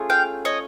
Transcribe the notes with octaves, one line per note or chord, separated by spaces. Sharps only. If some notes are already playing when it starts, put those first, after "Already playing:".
Already playing: A3 C#4 F4 G#4
F5 G5
C#5 D#5